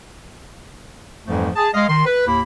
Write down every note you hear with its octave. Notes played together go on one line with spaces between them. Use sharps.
F2 G#2 E3 F3 G3 A3
G#4 A5
G#3 D#5 F5
D#3 C6
B4
D#2 A2 A#3 E4 B5